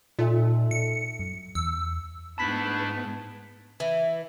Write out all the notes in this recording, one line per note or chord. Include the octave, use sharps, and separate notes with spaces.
A#2 D#4 A4 E5
C#7
F#2
E2 E6
G#2 A3 B3 D4 E4 A5 B5 B6
E3